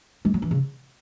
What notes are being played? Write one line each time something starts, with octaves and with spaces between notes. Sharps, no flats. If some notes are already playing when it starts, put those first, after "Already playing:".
G#3
F#3
E3
C#3